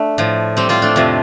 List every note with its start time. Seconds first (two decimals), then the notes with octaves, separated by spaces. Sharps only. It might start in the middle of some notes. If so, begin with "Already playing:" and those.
Already playing: A3 D4
0.18 A2 F3
0.57 G3 C4
0.69 C4 F4
0.82 A3 D4
0.96 F2 C3 F3